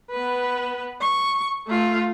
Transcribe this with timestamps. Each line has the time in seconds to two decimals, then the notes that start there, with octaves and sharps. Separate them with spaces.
0.11 B3 B4
1.01 C#6
1.68 A3 F4